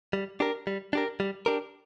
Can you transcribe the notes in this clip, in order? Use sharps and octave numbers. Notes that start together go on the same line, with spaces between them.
G3
D4 G4 A#4
G3
D4 G4 A#4
G3
D4 G4 A#4